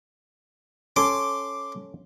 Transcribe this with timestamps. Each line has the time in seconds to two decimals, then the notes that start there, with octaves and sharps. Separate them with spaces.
0.96 C#4 A4 C#5 C6 D6